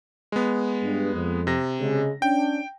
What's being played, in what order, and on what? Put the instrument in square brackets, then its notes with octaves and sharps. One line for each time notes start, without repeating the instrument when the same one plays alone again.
[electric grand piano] G#3 B3
[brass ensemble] G2
F2
[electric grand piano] C3 A#6
[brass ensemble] C#3 G#3
[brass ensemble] C#4 D4 [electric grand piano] G5